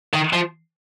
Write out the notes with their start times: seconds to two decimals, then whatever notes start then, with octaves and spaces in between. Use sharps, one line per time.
0.13 D#3
0.33 F3